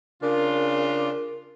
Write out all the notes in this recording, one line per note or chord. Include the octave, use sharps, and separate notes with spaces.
C#3 D4 F4 A#4